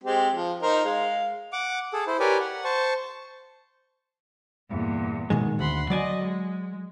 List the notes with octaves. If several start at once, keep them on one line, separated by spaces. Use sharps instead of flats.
G#3 C4 G4
F3
D#4 A#4 C5
G#3 F5
F#5 D6
G#4 A4
E4 C5
G4 A#4 B4 C#5 D5 G#5
F#5
C5 A5 C#6
E2 G2 A#2
B2 D#3 G#3
D2 F#5 B5 C6
F#3 D5 D#5 G#5
G#3